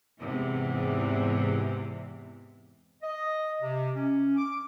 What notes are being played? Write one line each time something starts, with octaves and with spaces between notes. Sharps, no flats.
E2 G#2 C3 E3
D#5
C3
C#4
D6